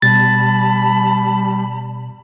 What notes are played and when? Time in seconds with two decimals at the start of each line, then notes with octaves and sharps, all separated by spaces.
0.02 B2 G3 A5 B5 A6